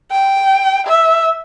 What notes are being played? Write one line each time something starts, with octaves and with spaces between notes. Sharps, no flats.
G5
E5